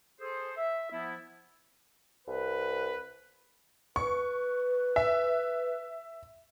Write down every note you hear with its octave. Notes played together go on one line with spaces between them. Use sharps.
G#4 A4 C5
E5
F3 B3 E4
C2 B4
B4 C#6
E5